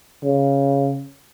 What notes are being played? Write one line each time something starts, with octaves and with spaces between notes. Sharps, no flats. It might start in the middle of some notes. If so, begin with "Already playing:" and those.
C#3